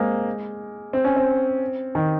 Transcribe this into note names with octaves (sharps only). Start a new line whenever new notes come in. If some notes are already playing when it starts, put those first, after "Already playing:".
Already playing: G#3 A#3 C4
C4
C#4
C4
D#3